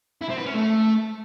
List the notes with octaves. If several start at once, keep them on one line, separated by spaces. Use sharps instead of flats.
E4
C4
B4
C#4
A3